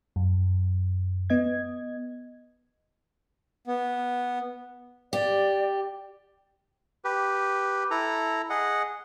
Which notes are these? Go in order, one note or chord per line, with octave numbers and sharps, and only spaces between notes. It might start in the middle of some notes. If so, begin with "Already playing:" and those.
F#2
B3 D#5 G#6
B3
G4 D5
G4 B4
E4 A4 A#5
G#4 D#5 F#5